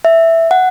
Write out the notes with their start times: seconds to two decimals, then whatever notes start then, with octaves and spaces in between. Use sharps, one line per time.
0.05 E5
0.51 F#5